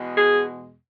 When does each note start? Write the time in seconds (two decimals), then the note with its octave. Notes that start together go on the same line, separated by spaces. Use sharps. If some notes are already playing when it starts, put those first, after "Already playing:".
Already playing: E2 B2 G#3
0.18 G#4